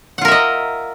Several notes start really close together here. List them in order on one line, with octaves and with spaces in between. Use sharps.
F#5 F4 A#4 E5 D#5